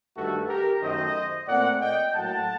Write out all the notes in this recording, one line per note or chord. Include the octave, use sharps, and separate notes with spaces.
G2 D#3 A3 F#4 A4
G4 A#4
F#2 D#3 A3 C5 D#5
A#2 A3 C4 D5 F#5
D#5 G5
A2 F#3 A#3 F#5 A5